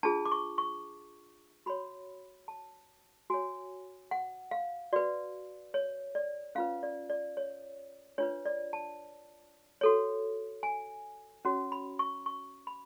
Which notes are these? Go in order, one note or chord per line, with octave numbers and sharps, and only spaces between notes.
D4 F4 G#4 A5
D6
C#6
C#6
F#4 C#5 B5
A5
F#4 C#5 G#5
F#5
F5
F#4 B4 D5
C#5
D5
C#4 F4 B4 F5
D5
D5
C#5
D4 F4 B4 C#5
D5
A5
F#4 A4 C#5
G#5
C#4 F#4 C#5
B5
C#6
C#6
B5